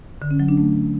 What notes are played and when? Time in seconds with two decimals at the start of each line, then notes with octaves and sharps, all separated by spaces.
0.22 D3
0.31 C#4
0.40 F#3
0.49 D4
0.57 A3